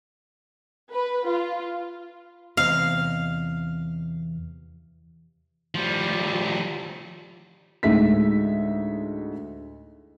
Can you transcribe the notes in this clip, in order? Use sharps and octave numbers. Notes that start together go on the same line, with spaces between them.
B4
F4
E2 C3 D#5 F5
F3 G3
D2 A2 G#3 D#4 E5 B6